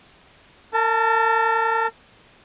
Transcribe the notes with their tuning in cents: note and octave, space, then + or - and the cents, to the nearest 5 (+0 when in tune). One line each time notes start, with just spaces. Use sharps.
A#4 -40 A5 +0